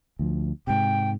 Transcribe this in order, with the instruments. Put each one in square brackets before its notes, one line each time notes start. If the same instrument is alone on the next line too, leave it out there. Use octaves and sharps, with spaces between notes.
[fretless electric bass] D2 F3
[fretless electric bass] G#2 C3 [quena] G5